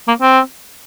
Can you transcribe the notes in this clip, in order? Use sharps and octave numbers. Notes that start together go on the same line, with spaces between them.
A#3
C4